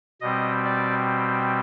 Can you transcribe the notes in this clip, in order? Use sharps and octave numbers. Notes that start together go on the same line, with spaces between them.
B2 G3 C4 D#5
D5